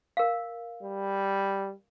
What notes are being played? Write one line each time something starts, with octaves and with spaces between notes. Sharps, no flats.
A#4 F5
G3